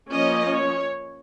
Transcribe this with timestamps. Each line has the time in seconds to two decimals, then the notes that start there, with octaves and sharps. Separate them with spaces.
0.12 F3 A#3 C#4 D#5
0.53 C#5